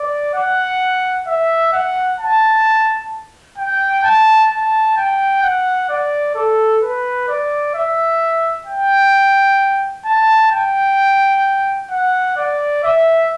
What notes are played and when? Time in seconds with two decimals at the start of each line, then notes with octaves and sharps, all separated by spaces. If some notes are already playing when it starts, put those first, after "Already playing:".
Already playing: D5
0.34 F#5
1.28 E5
1.73 F#5
2.20 A5
3.58 G5
4.04 A5
4.51 A5
4.97 G5
5.43 F#5
5.90 D5
6.35 A4
6.83 B4
7.28 D5
7.75 E5
8.67 G5
10.05 A5
10.52 G5
11.91 F#5
12.37 D5
12.84 E5